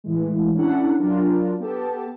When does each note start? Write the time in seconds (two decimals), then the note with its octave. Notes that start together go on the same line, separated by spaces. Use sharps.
0.04 A2 E3 G#3
0.55 C#4 D4 E4 A4 F#5
0.99 F#3 D4 F4 A#4
1.60 B3 G4 A4 A5